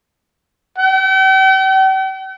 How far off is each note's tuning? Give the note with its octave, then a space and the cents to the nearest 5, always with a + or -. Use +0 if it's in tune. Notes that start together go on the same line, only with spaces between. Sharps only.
G5 -45